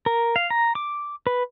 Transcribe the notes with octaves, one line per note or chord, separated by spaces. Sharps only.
A#4
F5
A#5
D6
B4